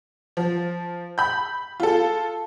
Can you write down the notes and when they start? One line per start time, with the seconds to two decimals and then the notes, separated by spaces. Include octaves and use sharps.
0.37 F3
1.18 B5 G6
1.80 F4 A4